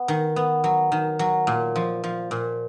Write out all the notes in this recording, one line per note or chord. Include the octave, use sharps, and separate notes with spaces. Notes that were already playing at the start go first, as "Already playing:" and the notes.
Already playing: B3
D#3
B3
F#3
D#3
F#3
A#2
F3
F3
A#2